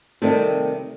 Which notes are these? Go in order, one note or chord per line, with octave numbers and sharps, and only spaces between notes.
C3 D#3 G3 A3 C4